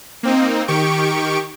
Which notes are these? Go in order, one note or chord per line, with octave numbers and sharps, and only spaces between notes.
A#3 C4 D#4
D#3 G4 C#6 D7